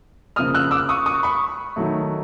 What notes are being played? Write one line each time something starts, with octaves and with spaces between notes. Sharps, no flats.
C#3 F3 A#3 D#6 F6
E6 F#6
D6 E6
C#6 D#6
C#6 D#6
B5 C#6
D#3 F#3 A3